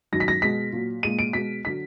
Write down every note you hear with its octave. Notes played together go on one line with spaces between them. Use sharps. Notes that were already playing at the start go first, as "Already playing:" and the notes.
F#2 D#3 F#3 A#6
B6
A#6
B2 G#3 B6
A#2 F#3
A#2 G#3 D#7
D7
B2 G#3 B6
D3 F#3 B6